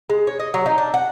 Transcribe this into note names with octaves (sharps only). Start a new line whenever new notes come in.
G#3
C#5
D#5
F#3
D#4
D4
F#5